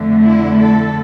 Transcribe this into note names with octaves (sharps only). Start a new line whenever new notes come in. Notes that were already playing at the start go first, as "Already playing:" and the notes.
Already playing: F2 D3 A3
E4
A4